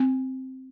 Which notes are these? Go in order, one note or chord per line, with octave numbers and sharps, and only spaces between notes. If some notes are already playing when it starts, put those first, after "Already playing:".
Already playing: C4